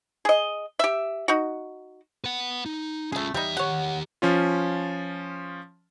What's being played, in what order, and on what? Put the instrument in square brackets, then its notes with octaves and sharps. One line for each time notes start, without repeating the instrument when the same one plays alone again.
[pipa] G#4 D#5
G4 E5
D#4 F#4
[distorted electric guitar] B4 F#5
D#4
[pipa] A3 G#4 [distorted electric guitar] C#4 F4
[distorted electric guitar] E2 E5 [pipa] G3 D#4
[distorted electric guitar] D#3 G4 [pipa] C#5 F#5
[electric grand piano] F3 C#4 F4